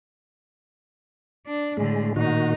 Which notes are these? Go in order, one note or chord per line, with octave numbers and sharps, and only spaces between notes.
D4
A2 D3 G#3
A#2 D#3 D#4 F#4